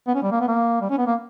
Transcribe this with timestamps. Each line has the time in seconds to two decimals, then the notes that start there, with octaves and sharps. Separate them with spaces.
0.07 B3
0.14 C#4
0.22 G3
0.31 A#3
0.40 B3
0.48 A#3
0.81 G3
0.90 C#4
0.98 B3
1.06 A#3